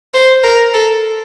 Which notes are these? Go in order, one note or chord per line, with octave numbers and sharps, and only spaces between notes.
C5
A#4
A4